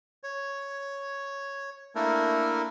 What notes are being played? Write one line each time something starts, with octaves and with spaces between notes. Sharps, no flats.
C#5
A3 A#3 D4 E4 A4 A#4